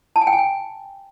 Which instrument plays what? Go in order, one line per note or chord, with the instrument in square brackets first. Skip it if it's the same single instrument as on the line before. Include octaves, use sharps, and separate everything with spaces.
[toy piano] A5
G#5
G5
G#5
G5